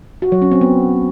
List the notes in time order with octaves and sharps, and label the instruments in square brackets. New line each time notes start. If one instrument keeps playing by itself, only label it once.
[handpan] F#4
F#3
C#4
C4
B3